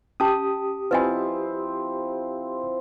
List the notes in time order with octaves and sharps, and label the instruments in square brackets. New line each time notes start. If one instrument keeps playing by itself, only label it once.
[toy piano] C#4 A5 [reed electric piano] G4 D#6
[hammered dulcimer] F3 C4 E4 [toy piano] B4 D#5 G#5